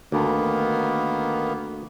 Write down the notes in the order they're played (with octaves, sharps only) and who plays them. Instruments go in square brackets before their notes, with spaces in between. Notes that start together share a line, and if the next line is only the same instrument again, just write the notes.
[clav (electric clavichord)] D2 [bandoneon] D#3 A#3 B3